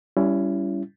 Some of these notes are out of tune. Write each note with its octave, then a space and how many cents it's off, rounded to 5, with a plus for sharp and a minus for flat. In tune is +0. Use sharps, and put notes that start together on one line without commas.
G3 +0 C#4 +25 E4 +25